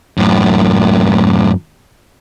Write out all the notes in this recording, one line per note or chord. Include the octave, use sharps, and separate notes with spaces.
F#2 A2